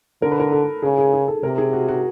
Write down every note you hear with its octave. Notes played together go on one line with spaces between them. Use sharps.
D3 A#4
B4
A#4
A4
C#3 G#4
G#4
G#4
A4
C3 A#4
G#4
F#4
F#4